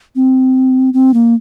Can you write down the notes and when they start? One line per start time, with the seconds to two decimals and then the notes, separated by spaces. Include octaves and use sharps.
0.16 C4
0.94 C4
1.14 A#3